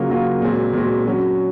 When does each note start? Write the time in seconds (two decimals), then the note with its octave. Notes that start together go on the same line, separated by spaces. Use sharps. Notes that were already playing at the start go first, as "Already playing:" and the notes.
Already playing: C#3 F#3 A#3 F4
0.10 C#3 F#3 A#3 F4
0.42 A#2 G#3 C4 F#4
0.73 A#2 G#3 C4 F#4
1.05 F#3 C#4 F#4